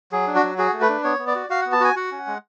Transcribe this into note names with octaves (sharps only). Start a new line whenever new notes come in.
F#3 G#4
D4
F#4
F#3
F#4 G#4
A3
B4
D4
B3 C#5
B3
D5
F#4
F#4 F5
B3 F#5
A5
F#4 G#5
F#4 F#5
C#4
G#3